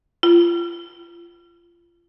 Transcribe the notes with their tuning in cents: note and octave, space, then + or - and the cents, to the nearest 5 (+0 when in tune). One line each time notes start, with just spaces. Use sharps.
F4 -25